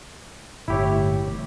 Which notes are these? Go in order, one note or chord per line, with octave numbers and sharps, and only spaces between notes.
G1 A2 E4 G4 C#5